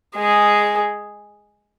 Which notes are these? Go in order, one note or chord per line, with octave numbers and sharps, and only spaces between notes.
G#3 G#4